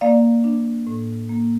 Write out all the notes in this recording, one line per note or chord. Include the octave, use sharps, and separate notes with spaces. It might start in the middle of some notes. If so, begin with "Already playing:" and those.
A#3 D5 F5
D4
A2
A#3